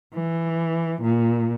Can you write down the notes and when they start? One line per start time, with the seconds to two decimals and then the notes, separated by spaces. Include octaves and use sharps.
0.14 E3
1.03 A#2